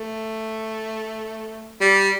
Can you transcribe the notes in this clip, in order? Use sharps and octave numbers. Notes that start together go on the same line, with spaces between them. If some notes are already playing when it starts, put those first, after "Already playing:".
Already playing: A3
G3